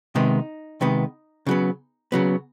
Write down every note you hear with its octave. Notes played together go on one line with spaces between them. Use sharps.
C3 D#3 G#3 B3 D#4
C3 D#3 G#3 B3
C#3 F#3 B3
C#3 F#3 B3